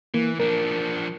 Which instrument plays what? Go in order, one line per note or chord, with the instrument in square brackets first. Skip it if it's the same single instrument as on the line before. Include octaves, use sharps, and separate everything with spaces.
[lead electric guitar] E3 [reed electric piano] A#3
[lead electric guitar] F3 D4 [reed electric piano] A#4